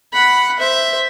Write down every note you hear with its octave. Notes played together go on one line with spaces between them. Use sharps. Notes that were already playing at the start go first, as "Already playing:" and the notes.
F#5 B5
C5 E5